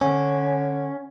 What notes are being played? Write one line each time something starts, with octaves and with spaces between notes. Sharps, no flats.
D3 C#4